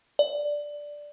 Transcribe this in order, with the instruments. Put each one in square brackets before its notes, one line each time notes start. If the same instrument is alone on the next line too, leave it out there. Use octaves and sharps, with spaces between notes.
[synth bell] D5